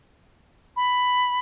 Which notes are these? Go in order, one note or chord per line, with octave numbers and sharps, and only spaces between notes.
B5